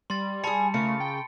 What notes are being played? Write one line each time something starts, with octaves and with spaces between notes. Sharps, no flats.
G3 C6 A6
G#4 G#5 A5 B5 C#7
C#3 A3 F4 A#4 C#7
G5